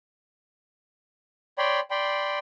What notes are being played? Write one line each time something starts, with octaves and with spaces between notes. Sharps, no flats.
C#5 D5 G5 B5 C6
D5 G5 B5 C6